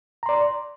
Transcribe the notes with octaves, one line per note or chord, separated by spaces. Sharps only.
D5 A#5 C6